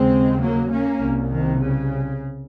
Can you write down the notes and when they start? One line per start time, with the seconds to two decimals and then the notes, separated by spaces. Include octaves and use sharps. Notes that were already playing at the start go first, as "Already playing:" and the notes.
Already playing: D#2 C#3 G#3 C4
0.41 F#3 A#3
0.70 A#3 C#4
1.00 C2 C3
1.32 D#3
1.61 C#3